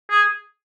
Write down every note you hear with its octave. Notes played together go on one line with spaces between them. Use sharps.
G#4